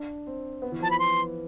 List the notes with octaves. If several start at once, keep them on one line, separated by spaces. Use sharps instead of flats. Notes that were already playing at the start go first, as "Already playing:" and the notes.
Already playing: D4
C4
B3
E3
F3 A5
B3 B5
C6